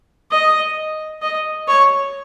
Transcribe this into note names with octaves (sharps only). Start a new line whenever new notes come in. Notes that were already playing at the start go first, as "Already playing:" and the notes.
D#5
D#5
C#5